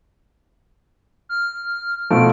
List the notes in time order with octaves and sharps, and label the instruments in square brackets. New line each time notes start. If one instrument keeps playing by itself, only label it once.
[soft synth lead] F6
[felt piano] B2 F3 A3 [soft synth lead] D7